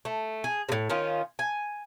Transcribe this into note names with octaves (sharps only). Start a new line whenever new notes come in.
A3
G#4
A2 C3
D#3 C#4 F4
G#5